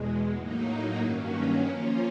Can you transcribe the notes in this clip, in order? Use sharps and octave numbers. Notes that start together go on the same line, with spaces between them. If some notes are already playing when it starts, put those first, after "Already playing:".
Already playing: E2 B2 G#3
A2 F#3 A#3 D#4
G2 D#3 F#3 A#3 C#4
F3 A#3 C#4 F4